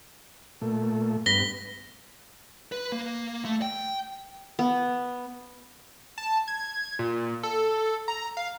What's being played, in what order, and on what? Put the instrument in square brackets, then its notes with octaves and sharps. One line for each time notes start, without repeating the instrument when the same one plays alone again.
[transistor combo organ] A#2 A3
[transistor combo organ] G2 B3 [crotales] A#6 B6 G7
[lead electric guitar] B4
A#3
A3
G5
[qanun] B3
[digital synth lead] A5
G#6
A#2
A4
A#5
F5